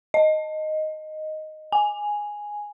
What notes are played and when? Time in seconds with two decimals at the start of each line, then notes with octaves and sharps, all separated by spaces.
0.14 D#5
1.72 G#5